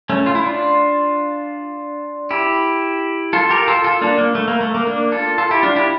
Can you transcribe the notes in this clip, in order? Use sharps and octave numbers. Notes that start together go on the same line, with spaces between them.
A3 C#4
F4
E4
D4 F4
E4 G4
F4 A4
G4 A#4
F4 A4
F4 A4
A#3 D4
A#3
A3
A#3
A3
A#3
A#3 D4
F4 A4
F4 A4
E4 G4
D4 F4
E4 G4